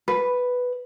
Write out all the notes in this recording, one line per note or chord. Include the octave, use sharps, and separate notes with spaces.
B4